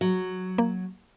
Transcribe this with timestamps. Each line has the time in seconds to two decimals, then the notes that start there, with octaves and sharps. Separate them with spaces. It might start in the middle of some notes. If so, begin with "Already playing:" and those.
0.01 F#3
0.58 A#3